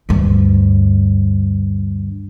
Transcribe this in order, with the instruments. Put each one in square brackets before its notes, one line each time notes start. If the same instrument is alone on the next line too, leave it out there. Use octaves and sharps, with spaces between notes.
[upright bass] D2 G2